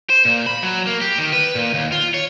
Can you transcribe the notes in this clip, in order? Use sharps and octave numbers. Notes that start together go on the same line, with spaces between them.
C5
A#2
B5
F#3
A#3
G4
D#3
B4
A#2
D#2
F4
C#5